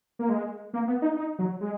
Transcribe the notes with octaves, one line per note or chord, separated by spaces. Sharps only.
A#3
G#3
A#3
B3
D#4
D#4
F#3
G#3